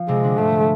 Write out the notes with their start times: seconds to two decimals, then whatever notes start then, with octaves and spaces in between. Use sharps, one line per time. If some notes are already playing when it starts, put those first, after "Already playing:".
Already playing: F3
0.08 C3 G#3 C4
0.23 D3 D4
0.37 G#2 G#3 A3